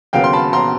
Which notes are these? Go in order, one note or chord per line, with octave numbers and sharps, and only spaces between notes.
D#2 C#3 F#3 B3 F5 G5
C6
A5 B5
A#5 C6